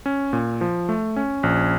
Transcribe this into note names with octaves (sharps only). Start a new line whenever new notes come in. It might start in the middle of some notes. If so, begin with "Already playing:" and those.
C#4
A#2
F3
A3
C#4
A#1